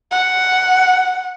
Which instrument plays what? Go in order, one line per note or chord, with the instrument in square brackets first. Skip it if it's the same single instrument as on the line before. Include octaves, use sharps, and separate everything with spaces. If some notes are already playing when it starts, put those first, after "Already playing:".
[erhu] F#5